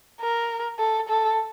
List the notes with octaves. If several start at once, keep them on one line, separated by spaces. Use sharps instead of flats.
A#4
A4
A4